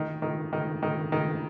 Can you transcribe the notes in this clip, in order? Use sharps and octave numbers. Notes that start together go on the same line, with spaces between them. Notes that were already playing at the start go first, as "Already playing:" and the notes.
Already playing: D#3
D#3
D#3
D#3
D#3